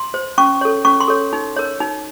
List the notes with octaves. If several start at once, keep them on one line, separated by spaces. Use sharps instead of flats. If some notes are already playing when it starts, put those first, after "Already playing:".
Already playing: C6
C5
C#4 C#6
A4 C#5
C#4 C#6
C6
A4 C#5
D#4
A#4 C#5
D#4